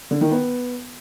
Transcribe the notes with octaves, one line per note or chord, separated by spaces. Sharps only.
D3
D#3
B3